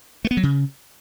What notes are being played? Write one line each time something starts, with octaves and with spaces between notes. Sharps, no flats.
A3
B3
F#3
C#3